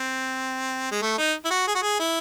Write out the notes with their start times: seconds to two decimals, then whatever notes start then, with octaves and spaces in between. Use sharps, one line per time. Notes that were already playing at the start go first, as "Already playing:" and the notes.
Already playing: C4
0.91 G#3
1.01 A3
1.18 D#4
1.45 E4
1.50 F#4
1.67 G#4
1.75 F#4
1.82 G#4
1.99 E4